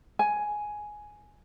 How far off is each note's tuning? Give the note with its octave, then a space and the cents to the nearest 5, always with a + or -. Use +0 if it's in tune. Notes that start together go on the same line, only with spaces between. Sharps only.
G#5 +5